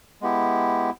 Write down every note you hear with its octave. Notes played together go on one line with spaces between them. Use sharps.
G#3 B3 E4 G4